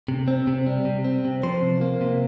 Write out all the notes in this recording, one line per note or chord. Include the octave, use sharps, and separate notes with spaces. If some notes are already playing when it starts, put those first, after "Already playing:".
C3
C4
C3
G3
C3
C4
C3
F3 C5
C3
A#3
C3